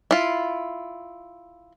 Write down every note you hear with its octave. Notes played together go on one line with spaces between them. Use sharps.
E4 F4